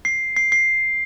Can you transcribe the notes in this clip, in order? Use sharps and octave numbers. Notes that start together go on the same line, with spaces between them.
C7
C7
C7